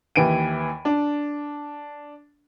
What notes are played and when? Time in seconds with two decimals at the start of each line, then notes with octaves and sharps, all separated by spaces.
0.16 D#2 E3 D7 D#7
0.85 D4